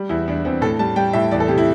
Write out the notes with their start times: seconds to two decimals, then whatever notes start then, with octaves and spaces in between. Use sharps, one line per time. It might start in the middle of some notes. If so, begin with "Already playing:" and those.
Already playing: G3
0.09 E2 E4
0.28 E2 D4
0.45 E2 C4
0.61 A2 A4
0.79 G3 A5
0.96 G3 G5
1.13 A2 E5
1.31 E2 D5
1.40 A4
1.48 C3 G4
1.58 E4